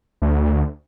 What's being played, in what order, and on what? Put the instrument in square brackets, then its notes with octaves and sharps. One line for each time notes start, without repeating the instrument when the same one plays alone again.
[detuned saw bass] D2